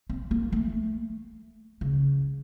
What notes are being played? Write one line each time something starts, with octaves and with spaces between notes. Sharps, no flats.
C4
A#3
A3
C#3